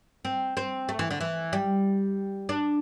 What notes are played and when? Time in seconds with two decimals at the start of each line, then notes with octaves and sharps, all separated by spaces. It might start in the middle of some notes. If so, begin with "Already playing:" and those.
0.25 C4
0.57 C4
0.89 A3
0.99 E3
1.11 D3
1.21 E3
1.53 G3
2.49 D4